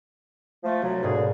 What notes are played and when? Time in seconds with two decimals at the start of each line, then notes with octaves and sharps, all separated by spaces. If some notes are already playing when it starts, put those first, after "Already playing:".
0.63 F3 A3
0.82 C2 F#3
1.03 D#2 G#2 B2 D3 G#4